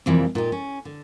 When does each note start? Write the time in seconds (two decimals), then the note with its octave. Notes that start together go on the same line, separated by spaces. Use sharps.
0.06 F2 C3 E3 F3 G3 A#3
0.35 A#2 D#4 G4
0.52 C#4
0.85 D3